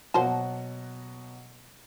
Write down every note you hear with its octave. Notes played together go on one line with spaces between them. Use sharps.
B2 F#3 A#3 C5 F#5 A5